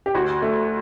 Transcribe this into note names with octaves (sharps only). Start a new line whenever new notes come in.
G4
D2 F#4
A3